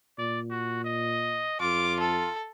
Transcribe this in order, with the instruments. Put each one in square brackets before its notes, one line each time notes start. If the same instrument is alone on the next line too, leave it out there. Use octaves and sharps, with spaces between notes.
[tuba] A#2 [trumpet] D5
[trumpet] F#4
D#5
[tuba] F2 [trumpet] F4 [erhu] D6
[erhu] A4